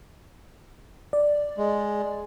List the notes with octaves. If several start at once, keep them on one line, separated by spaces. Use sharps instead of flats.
D5
G#3